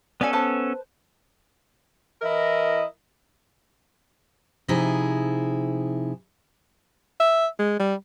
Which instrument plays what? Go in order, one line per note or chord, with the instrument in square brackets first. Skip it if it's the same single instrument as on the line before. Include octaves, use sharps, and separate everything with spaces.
[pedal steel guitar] B3 C#4 A4 [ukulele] D5 G#5
[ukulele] B4 C5 A5
[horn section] E3 E4 A#4 D#5
[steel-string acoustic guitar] C3 F3 D#4 E4 G#4
[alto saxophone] E5
G#3
G3